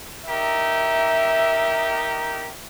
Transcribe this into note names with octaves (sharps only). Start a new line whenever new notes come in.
D#4 G4 A#4 E5